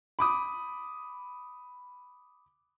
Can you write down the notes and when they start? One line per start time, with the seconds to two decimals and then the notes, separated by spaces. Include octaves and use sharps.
0.19 B5 D6 D#6